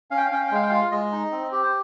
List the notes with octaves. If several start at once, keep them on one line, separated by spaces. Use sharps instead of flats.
C#4 F5
G5
F5
C#4 G5
F5
G5
G#3 F5
G5
F4 F5
G#3 D#5
D#4
C4
G4
C5